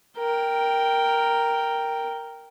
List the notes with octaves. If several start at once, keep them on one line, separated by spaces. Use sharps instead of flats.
A#4 G5